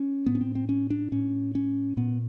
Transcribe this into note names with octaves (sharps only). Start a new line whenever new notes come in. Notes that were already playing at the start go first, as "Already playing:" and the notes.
Already playing: C#4
A2 B3
C#4
C4
C4
C#4
D4
A2 C#4
C#4
A#2 B3